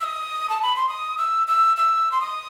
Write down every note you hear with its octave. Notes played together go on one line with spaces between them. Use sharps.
E6
D#6
A5
B5
C6
D#6
E6
E6
E6
C6
D#6